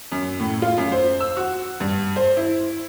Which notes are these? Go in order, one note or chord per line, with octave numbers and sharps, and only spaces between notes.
F#2
A2
F4
F#2
C5
E6
F#4
G2
C5
E4